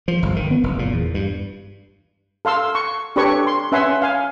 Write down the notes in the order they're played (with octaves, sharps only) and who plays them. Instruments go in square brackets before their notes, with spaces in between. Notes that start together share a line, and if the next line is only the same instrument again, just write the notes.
[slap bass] F3
G1
D#3
B3
F#1
A#2
E2
G2
[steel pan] A4 F5 C6 E6
C#6
D4 G4 A4 B4 C#5 C#6
C6
C#4 B4 E5 F#5 G#5 C6
F5 G#5